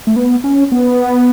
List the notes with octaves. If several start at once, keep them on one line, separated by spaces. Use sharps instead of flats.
A3
B3
C#4
B3